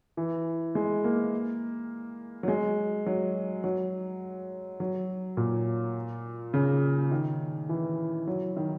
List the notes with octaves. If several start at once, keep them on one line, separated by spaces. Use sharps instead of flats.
E3
G#3
A#3
F#3
G#3
F#3
F#3
F#3
A#2
C#3
D#3
E3
F#3
D#3